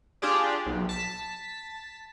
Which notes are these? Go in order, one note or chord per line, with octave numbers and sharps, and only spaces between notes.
D4 F4 G4 G#4 D5
B1
A5 B6